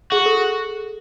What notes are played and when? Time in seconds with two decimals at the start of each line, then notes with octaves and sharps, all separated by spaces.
0.12 F#4 G#4
0.26 A4